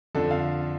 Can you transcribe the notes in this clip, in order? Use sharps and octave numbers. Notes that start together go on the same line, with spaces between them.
F2 D3 F3 A4
F5